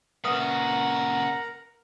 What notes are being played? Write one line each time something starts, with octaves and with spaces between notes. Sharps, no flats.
A#2 C#3 A#4 B4 E5 F#5 A#5 D#6